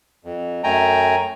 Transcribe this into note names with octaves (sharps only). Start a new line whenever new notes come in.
F2
F#2 A3 G5 G#5 A#5